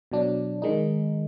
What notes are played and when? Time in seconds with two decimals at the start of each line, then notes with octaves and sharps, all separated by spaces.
0.12 B2 F#3 D4
0.62 D#3 G#3 D#4